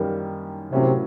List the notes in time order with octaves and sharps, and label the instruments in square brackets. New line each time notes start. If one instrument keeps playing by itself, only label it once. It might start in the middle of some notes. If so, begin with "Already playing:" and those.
Already playing: [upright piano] F#2 D#3 G3 A#3
[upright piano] A2 F#3 A#3 C#4 E4 [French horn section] C3